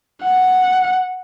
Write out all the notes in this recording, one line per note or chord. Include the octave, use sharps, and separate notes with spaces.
F#5